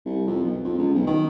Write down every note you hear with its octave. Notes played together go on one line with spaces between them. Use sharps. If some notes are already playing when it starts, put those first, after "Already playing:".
C2
F2
B1
F2
C#2
B1
D#3